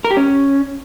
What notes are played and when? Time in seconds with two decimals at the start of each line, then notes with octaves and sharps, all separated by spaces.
0.05 A#4
0.11 G4
0.17 C#4